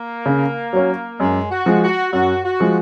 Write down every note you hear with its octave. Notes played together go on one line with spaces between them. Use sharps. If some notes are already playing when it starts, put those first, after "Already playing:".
Already playing: A#3
C#3
F#3 C#4
F#2 G#3
F#4
F3 G#3
F#4
F#2 F#4
F#4
F3 G#3